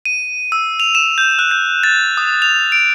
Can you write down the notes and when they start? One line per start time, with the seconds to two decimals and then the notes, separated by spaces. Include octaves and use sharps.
0.05 D#7
0.52 E6
0.80 F7
0.95 E7
1.18 G6
1.39 F#6
1.51 G6
1.83 A6
2.17 D#6
2.42 F7
2.72 D7